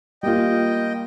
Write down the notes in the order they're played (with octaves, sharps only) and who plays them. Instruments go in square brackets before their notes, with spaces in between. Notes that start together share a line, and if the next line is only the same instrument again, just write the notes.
[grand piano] G3 A#3 F4 [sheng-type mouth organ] D#5 G5